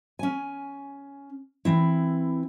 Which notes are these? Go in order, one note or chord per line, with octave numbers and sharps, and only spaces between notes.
C#4 G#5
E3 C4 E4